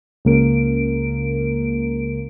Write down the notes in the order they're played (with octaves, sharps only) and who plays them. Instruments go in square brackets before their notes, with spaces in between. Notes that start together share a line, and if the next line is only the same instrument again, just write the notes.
[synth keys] C#2 C#3 A#3 A#4 D7